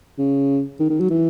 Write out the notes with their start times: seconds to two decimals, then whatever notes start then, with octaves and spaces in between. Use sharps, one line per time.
0.18 C#3
0.80 D#3
0.90 D#3
1.00 F#3
1.10 E3